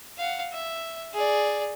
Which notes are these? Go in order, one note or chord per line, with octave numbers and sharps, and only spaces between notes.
F5 F#5
E5
G#4 D5